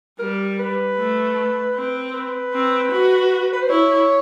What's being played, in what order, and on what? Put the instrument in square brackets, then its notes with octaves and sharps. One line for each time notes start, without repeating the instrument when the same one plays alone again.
[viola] G3 [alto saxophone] A#4
[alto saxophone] B4
[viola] A3
C4
[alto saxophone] B4
[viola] C4
F#4
[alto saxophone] B4
C5
[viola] E4 [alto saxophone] C#5